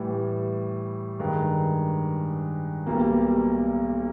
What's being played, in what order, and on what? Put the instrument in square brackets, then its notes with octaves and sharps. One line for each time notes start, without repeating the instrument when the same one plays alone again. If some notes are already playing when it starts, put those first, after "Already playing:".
Already playing: [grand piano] A2 E3 G3
G2 D#3 G#3
B1 B2 G3 A#3